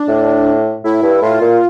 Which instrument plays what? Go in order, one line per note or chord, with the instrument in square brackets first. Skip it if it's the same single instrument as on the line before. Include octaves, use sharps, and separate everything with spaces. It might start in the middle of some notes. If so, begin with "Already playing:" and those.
Already playing: [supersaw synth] D4
[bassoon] A2
[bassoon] A2 [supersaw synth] E4
[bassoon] G2
[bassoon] A2 [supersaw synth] F4
[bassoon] A#2